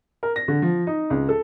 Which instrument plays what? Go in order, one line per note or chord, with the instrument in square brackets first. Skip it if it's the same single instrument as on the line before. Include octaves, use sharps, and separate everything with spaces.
[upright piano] A#4
A#6
D3
F3
D#4
C#2
A4